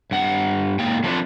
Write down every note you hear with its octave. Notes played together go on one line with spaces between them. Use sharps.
G2 F#5
G#2 A#3 G5
F3 F#3 A3 C4 D4 E4